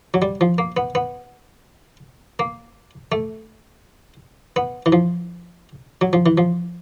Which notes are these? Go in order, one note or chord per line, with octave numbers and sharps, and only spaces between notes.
F#3
G3
F3
A#3
B3
B3
A#3
A3
B3
E3
F3
F#3
F3
E3
F3